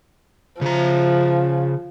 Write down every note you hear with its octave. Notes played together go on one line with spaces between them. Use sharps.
C#3 F3 A#5